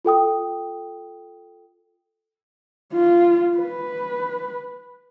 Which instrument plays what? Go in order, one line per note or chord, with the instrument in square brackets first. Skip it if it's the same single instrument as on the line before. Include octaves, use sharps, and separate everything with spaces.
[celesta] F4 A4 G5 D#6
[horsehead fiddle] F4
B4